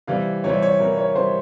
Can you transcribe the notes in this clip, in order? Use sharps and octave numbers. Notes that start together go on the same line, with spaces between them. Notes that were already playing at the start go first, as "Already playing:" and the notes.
C3 E3 G3 F5
C3 E3 G3 C#5
C#5
C3 E3 G3 A#4
C#5
C3 E3 G3 C5